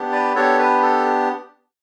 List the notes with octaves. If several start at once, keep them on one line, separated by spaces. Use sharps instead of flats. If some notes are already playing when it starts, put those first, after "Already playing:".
Already playing: B3 D4 G4
B4 D5
B3 D4 G4 A4 C#5
B4
A4